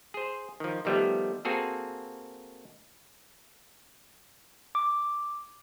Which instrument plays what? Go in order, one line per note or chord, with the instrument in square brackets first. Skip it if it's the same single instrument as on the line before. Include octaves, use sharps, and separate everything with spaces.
[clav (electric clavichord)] G#4 C5
D#3 F3
D#3 F3 G3 A3 B3
A#3 C4 F#4 G#4 A4
[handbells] D6